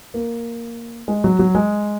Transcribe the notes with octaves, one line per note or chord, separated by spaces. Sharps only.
A#3
G#3
F#3
F#3
G#3